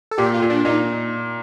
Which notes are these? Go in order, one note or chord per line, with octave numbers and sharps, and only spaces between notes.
A4
A#2 G4
F4
A#2
D4
A#2 D#4